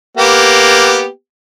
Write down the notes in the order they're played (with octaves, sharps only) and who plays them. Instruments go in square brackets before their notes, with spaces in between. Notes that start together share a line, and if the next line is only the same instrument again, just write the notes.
[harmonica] A#3 B3 G4